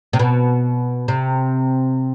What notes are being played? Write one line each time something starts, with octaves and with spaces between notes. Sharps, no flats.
C3
B2
C3